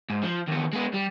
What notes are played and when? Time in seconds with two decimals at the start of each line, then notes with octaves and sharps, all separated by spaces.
0.10 G#2
0.23 F3
0.48 D#2 B3
0.73 G#3 B3
0.93 G3